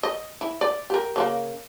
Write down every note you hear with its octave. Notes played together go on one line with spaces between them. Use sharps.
D#5
E4
D5
G4 A#4
C#3 G#3 A#3